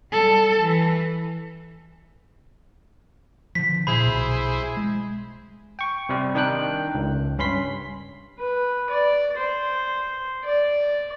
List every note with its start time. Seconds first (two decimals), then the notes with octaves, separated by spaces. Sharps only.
0.11 G3 A4
0.61 E3
3.55 D3 F3 B6
3.87 A#2 E4 G#4 C5 B5
4.06 B1
4.77 G#3
5.79 G5 C#6
6.09 C3 G3
6.35 D#3 D4 A#4 G5 F#6
6.95 C#2
7.38 G2 C#4 B5 C6 B6
8.39 B4
8.90 D5
9.37 C5
10.44 D5